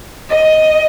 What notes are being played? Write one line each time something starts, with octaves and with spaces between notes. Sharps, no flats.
D#5